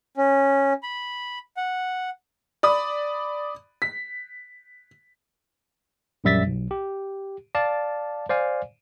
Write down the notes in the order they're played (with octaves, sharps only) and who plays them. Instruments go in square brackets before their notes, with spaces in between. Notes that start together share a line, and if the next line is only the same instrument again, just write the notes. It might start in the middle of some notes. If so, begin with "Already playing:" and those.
[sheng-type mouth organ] C#4
B5
F#5
[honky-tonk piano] D5 B5 D#6
B6
[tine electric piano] A#1 F#2 G3 E5 A6 B6
B1
G4
D5 F5 A5
C5 D5 F5 G#5